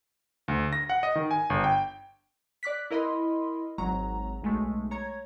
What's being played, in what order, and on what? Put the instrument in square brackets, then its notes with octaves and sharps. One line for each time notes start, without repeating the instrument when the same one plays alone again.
[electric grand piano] D2
A#6
F#5
D#5
D#3
G#5
G1
G5
[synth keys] D5 D6 F#6 B6
E4 A#4 D#5 B5 C6
G#1 F#3 A#5
B1 G#3 A3
C#5 A#5 G#6